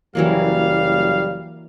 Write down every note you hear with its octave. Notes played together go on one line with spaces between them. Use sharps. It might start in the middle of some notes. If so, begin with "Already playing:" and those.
F#1 E3 F#3 G3 A#3 F5